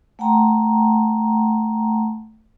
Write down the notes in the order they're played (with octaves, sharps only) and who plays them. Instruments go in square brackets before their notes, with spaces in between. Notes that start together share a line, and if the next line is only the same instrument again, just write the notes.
[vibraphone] A3 F#5 G5 A5 A#5 C6